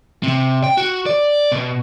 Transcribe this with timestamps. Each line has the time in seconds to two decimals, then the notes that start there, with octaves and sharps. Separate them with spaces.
0.23 C3
0.64 G5
0.77 F#4
1.06 D5
1.52 B2